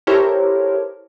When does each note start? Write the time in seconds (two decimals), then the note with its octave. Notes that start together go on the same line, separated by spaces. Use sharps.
0.07 E4 G4 A4 A#4 C5 C#5